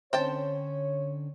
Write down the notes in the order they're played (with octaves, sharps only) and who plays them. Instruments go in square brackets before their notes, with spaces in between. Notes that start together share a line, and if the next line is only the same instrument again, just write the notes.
[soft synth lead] D3 [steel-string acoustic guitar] C4 C#4 [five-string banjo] C5 G5 A5 [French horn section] C#5